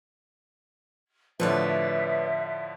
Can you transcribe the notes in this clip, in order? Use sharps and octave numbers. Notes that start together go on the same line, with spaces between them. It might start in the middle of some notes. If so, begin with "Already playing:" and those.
A2 D3 F3 B4 C#5 D5 E5